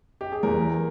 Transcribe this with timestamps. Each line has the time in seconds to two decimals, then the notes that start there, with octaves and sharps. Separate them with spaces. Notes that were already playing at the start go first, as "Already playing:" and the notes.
0.21 G4
0.32 G#4
0.43 E2 A#4